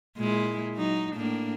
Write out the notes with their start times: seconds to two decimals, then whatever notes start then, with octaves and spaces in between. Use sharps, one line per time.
0.17 A#2 G#3 E4
0.75 F#3 D#4
1.14 A2 A#3 D4